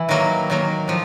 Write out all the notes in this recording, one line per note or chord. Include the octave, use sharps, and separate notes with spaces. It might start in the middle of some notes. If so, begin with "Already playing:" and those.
Already playing: E3 E4
D#3 F#3 A#3
D#3 F#3 A#3
A2 F3